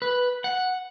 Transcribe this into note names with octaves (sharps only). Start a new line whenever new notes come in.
B4
F#5